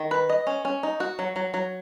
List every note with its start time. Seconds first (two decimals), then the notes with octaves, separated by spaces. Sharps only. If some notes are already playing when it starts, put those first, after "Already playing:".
Already playing: D#3
0.11 B4
0.29 D#5
0.47 C#4
0.65 C#4
0.83 D#4
1.00 F#4
1.19 F#3
1.36 F#3
1.54 F#3